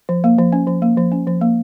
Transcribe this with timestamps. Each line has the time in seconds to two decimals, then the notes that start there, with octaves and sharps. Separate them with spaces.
0.09 F3
0.24 A#3
0.38 F3
0.53 C#4
0.67 F3
0.82 A#3
0.97 F3
1.12 C#4
1.27 F3
1.41 A#3